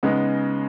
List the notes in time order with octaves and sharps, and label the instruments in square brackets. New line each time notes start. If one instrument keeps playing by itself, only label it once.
[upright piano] C#3 G#3 B3 D#4